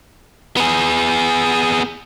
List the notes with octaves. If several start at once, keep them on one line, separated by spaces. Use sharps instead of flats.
B3 G#4